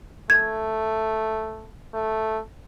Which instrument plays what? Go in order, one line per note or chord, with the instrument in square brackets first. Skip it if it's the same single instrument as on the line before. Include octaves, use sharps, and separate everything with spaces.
[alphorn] A3 [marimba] G#6
[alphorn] A3